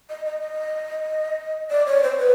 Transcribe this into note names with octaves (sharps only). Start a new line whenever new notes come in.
D#5
D#5
D#5
D5
C#5
C5
B4